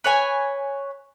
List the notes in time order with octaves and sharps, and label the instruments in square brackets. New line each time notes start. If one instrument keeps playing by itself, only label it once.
[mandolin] B4 C#5 G#5